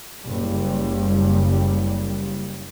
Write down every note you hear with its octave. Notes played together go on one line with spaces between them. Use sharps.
F#1 G3